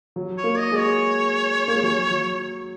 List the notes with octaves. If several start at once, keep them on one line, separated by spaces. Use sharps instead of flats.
F#3
C#5
A#3
D#5
G#3
C#5
A#3
G#3
F#3
F#3